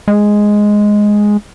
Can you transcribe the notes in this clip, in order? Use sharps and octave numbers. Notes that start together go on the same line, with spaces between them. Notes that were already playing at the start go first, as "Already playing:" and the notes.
G#3